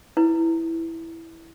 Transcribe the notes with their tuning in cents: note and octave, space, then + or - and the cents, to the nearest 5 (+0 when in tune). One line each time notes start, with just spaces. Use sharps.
E4 +0 B4 +10